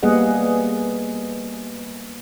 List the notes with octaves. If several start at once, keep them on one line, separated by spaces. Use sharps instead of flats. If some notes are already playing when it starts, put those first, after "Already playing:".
G3 A#3 B3 G#4 D#5 F#5